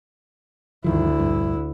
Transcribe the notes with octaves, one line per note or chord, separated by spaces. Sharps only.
D2 G2 D#3 F3 E4
A#1 G2